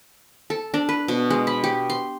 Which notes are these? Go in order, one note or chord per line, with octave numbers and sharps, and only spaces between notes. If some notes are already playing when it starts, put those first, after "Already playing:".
A4
D4
B4
B2
G#3
B5
G4
C6